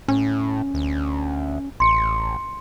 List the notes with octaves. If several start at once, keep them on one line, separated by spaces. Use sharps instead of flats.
A2 C#4
D2
A1 C6 C#7